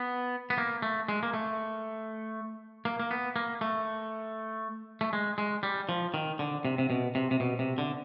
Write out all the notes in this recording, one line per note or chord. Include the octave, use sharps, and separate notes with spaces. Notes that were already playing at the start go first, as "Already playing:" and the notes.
Already playing: B3
B3
A#3
A3
G#3
A#3
A3
A#3
A#3
B3
A#3
A3
A3
G#3
G#3
G3
F3
D#3
D3
C3
C3
B2
C3
C3
B2
C3
D3